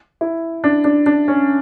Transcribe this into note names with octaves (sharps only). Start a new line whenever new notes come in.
E4
D4
D4
D4
C#4